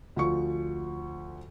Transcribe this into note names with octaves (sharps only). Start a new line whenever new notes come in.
D2 F3 C#6